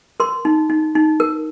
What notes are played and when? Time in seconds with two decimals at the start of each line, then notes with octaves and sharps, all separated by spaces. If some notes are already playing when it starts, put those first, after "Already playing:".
0.20 A#4 C6
0.45 D#4
0.70 D#4
0.95 D#4
1.20 A#4